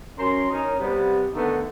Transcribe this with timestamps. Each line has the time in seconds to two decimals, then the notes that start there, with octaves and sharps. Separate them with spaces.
0.19 F#2 C#4 A#4 C6
0.51 C#4 D#4 A#4
0.80 C3 G3 B3
1.34 D3 D#3 A3 B3 D#4